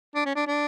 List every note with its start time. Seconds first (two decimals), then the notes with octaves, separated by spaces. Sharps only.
0.15 D4
0.25 C#4
0.35 D4
0.47 D4